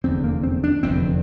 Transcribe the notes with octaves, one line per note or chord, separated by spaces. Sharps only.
F1 E2 D3 C4
A#3
C4
D4
F1 E2 D3 C4